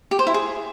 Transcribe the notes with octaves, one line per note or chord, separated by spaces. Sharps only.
G4
C5
E4
G#4